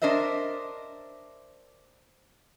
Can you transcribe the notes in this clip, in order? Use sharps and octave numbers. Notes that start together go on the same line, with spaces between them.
D4 A#4 C5 D#5 E5